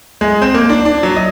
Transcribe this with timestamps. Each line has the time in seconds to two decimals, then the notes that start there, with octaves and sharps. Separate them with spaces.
0.21 G#3
0.42 C4
0.54 A#3
0.70 D4
0.85 D4
1.03 F#3
1.16 D#5